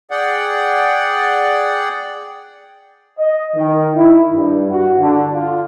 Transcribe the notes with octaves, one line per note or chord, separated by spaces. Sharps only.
G#4 D5 F#5 G5
D#5
D#3
E4
G2
F#4
D3
F4